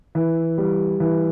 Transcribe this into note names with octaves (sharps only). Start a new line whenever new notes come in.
E3
G3
E3